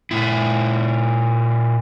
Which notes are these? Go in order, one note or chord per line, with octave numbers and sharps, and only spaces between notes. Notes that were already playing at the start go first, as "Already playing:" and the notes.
A#2 E4